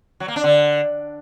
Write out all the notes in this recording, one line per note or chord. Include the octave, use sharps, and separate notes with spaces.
F#3
A#3
D4
D3